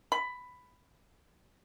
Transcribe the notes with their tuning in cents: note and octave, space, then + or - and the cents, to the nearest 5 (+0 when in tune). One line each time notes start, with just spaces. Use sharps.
B5 +10